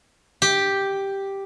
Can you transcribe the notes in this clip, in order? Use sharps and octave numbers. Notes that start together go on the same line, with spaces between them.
G4